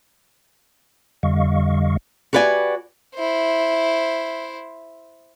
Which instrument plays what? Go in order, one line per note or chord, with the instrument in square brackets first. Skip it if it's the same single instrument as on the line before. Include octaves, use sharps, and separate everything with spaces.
[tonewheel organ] F2 D3 G3 D#5 F5 C#6
[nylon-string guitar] F#4 G4 B4 D5 G5 G#5
[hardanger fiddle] E4 C5